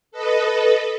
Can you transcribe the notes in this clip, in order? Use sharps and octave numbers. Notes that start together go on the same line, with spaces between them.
A4 B4 D#5